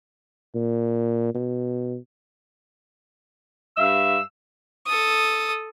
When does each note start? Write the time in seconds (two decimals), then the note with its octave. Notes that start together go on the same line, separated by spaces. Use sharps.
0.55 A#2
1.35 B2
3.77 G2 E5 F5 E6
4.86 A4 D#6